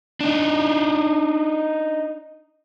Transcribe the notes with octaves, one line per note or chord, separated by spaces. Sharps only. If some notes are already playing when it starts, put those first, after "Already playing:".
D4 D#4